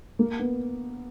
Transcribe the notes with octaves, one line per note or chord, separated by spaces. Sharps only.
A#3
B3